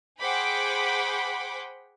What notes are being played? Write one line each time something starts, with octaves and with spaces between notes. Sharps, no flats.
G#4 C5 F#5 G5 B5 D6